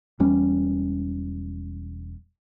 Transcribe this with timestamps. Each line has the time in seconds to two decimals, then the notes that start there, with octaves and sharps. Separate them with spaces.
0.20 E1 E2 G3 C#4